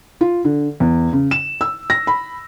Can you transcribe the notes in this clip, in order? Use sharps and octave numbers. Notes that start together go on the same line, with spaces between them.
F4
D3
E2
C#3
E7
E6
A#6
B5